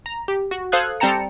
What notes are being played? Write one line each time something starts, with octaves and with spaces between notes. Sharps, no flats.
A#5
G4
F#4
A4 C5 F5 D#6 F#6 G#6
G3 C4 G5 A5 A#5 C#7